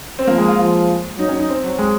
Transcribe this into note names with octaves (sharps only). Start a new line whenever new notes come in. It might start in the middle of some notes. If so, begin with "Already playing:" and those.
C4
F3 A#3
G#3
F4
F3 F4
F#3 D#4
C#4
D#4
C4
F#3
G#3